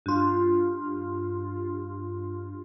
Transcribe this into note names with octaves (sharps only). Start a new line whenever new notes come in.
G2 F4